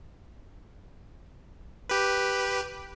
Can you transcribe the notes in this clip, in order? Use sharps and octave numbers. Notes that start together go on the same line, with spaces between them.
G4 B4